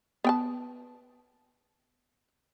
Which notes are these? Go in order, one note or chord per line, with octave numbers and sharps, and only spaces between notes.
B3 G5 A5